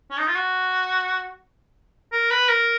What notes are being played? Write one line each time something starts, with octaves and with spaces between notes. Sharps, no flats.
C#4
D#4
F4
F#4
A#4
B4
A#4